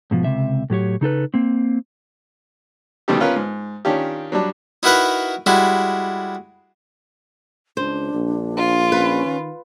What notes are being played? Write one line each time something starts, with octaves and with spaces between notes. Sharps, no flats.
G#2 B2 F3
C#2 C3 E5
A2 F#3 G4 C#5
C#3 D#4 A4 B4
A#3 C4
B2 D3 D#3 G3 A3 G4
B3 C#4 F4 A#4 B4
G#2
D#3 C#4 D4 F4 G4
F#3 G3 D4
D#4 E4 F#4 A#4 B4 F#5
G3 G#3 E4 F#4
C#2 D4 C5
A#1
F4
C#4 B4
D#3